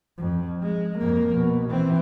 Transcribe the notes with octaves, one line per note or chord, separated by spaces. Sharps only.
F2
G#3
F2 A#3
B2
E3 C4